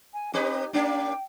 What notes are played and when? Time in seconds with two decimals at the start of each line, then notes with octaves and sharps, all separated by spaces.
0.14 G#5
0.34 C4 D#4 G4 B4
0.73 A#3 C#4 D4 G5